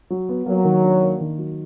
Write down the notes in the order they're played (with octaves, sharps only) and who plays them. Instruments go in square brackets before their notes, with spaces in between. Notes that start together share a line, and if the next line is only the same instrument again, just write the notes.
[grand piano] F#3
B3
[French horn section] F#3 [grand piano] A#3
[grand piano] D#3
D4
A#3
D#3
F#3